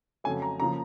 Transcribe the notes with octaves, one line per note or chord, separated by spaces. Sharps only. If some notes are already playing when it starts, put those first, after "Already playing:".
F2 C#3 F#3 A3 G#5
A#5
C#3 F3 A#3 A#5